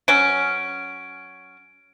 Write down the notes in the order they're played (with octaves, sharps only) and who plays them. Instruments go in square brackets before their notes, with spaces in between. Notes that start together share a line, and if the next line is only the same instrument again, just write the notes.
[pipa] F#3 C#4 [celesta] D7